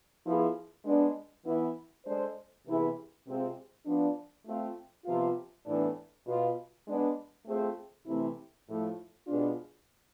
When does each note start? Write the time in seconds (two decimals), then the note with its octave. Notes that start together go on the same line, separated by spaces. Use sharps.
0.24 F3 B3 E4 G#4
0.85 G#3 B3 D4
1.45 E3 B3 E4
2.05 G#3 D4 A4 C5
2.65 C3 E3 B3 E4 G#4
3.26 C3 G#3 C4 F4
3.86 F3 B3 D4
4.46 A3 C4 F4
5.06 C3 F3 B3 F4
5.65 A2 E3 B3 D4
6.26 B2 B3 F4
6.86 G#3 B3 D4
7.46 A3 C4 F4 G#4 C5
8.06 C3 E3 A3 C4 E4
8.68 A2 F3 A3
9.27 B2 G#3 B3 D4 F4